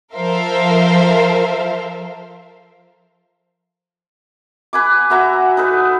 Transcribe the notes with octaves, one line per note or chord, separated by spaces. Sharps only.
F3 A4 A#4 C5 E5 F5
B4 G#5 D6
F#4 B4 E5 A#5
D#4 A4 B4